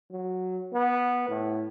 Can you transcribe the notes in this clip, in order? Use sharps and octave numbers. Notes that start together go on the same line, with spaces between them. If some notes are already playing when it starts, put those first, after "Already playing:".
F#3
B3
A2